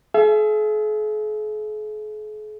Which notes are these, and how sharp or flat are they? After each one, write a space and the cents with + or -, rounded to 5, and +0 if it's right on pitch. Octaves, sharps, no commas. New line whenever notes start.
G#4 +45 E5 +35